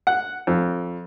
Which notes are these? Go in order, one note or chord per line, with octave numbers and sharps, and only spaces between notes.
F#5
F2